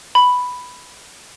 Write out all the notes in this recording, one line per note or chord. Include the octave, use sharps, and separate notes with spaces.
B5